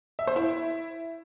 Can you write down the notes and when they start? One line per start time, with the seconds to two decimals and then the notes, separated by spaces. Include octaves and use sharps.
0.19 E5
0.27 C5
0.36 E4